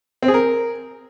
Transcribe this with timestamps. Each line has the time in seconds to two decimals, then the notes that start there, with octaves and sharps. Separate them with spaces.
0.22 C4
0.28 G#4
0.34 A#4